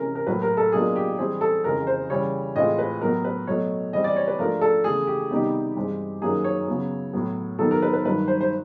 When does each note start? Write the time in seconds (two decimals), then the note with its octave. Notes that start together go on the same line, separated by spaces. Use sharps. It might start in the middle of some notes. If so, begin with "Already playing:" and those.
Already playing: C3 E3 G#3 C#4 A#4
0.15 A#4
0.26 A2 F#3 A#3 B4
0.42 A#4
0.57 A4
0.72 B2 F#3 A#3 D4 F4 G#4
0.96 G4
1.18 E3 G3 C4 E4 G#4
1.41 A4
1.64 F2 C#3 E3 G#3 A#4
1.87 C5
2.10 C#3 E3 G3 C#5
2.55 A2 E3 G#3 C4 F4 D#5
2.79 B4
3.01 A2 F#3 B3 A#4
3.24 B4
3.47 B2 F#3 A3 C#5
3.93 E3 G3 C4 D#5
4.04 D5
4.16 C#5
4.27 B4
4.39 G#2 F3 A3 D4 A#4
4.61 A4
4.84 E2 C#3 E3 A3 G#4
5.07 G4
5.30 C3 D#3 G3 B3 D#4 G4
5.76 G2 E3 G#3 C4
6.22 F#2 D#3 F#3 A#3 G#4
6.44 C#5
6.67 C#3 F#3 B3
7.13 A2 F#3 B3
7.59 D#3 F#3 B3 A4
7.71 A#4
7.82 B4
7.93 B4
8.05 G2 D#3 F#3 B4
8.28 C5
8.41 C5